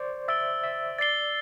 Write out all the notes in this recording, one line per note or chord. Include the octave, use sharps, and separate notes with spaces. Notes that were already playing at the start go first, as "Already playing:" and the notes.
Already playing: C5 D5
E5 E6 A6 D7 G7
E5
D5 A6 C7 G7